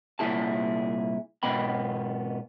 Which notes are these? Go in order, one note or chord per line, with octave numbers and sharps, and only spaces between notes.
C2 A#2 E4 G#4 A5
G#2 B2 B3 G5 B5